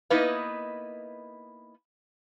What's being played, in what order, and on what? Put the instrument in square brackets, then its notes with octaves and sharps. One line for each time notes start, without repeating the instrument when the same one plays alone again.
[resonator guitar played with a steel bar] A#3 B3 D#4 E4 B4 D#5